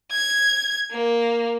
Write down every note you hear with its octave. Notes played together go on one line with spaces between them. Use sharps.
G#6
A#3